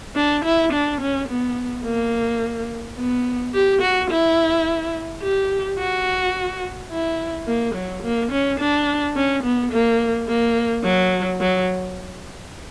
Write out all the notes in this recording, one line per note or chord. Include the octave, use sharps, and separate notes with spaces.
D4
E4
D4
C#4
B3
A#3
B3
G4
F#4
E4
G4
F#4
E4
A#3
F#3
A#3
C#4
D4
C#4
B3
A#3
A#3
F#3
F#3